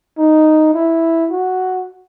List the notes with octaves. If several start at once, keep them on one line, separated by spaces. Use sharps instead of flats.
D#4
E4
F#4